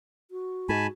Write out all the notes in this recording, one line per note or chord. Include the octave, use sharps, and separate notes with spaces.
F#4
G#2 G#5 A5 B5